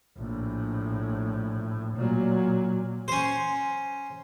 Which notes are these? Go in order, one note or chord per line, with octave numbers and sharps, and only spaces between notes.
A#1 A2
A#2 F#3
C#4 C5